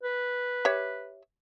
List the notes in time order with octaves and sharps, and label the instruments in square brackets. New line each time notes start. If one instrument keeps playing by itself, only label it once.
[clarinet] B4
[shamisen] G4 C#5 E5